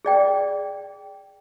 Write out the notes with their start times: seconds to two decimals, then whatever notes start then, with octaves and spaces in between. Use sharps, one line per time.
0.05 G#4 D5 G5